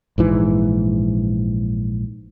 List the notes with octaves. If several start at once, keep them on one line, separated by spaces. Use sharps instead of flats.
A#1 G#2 E3